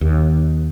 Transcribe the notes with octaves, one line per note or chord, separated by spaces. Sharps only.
D#2